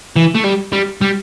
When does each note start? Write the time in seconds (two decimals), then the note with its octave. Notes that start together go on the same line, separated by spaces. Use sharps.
0.16 E3
0.35 A3
0.44 G3
0.73 G3
1.01 G3